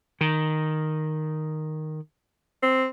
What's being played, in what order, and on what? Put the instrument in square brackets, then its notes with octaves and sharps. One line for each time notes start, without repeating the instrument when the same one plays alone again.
[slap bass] D#3
[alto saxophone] C4